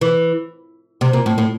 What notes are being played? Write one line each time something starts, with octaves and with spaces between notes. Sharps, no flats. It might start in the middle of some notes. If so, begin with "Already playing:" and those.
E3
C3
A#2
A2
A2